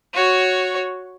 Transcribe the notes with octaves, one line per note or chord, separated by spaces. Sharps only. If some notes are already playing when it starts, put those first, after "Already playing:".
F#4 C#5